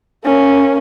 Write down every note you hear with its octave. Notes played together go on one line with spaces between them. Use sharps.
A#3 C#4